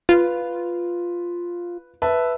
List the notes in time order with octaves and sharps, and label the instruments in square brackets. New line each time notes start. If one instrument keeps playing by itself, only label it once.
[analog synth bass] F4 [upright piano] B4
[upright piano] B4 E5 A5